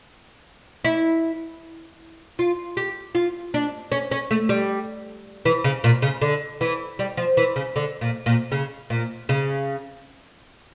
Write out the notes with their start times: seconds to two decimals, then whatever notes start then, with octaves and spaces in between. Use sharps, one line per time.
0.85 E4
2.39 F4
2.77 G4
3.15 F4
3.54 D4
3.92 C#4
4.11 C#4
4.31 A3
4.49 G3
5.45 E3
5.64 C#3
5.84 A#2
6.02 C#3
6.21 D3
6.61 E3
6.99 G3
7.17 F3
7.37 E3
7.56 C#3
7.76 D3
8.01 A#2
8.26 A#2
8.52 C#3
8.90 A#2
9.29 C#3